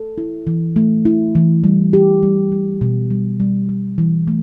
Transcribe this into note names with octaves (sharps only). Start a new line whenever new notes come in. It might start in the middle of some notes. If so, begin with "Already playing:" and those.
Already playing: A4
E4
E3
A3
E4
E3
G3
G4
G3
G3
B2
G3
G3
G3
E3
A3